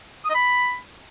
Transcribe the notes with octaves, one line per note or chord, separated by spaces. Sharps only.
D#6
D#5
B5